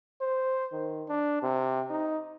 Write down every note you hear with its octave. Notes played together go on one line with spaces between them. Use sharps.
C5
D#3
D4
C3
D#4